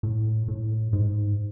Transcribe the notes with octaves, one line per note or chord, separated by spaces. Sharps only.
A2
A2
G#2